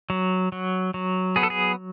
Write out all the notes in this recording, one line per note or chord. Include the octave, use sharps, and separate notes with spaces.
F#3
F#3
F#3
B3 G#4
A4
G#4